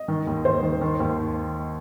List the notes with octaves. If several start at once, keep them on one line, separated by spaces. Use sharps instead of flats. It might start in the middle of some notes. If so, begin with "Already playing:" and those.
Already playing: D#5
D#3
D#2
D#2 C5
D#3
D#3
D#2